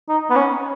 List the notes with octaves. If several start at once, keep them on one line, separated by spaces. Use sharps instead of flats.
D#4
B3
C#4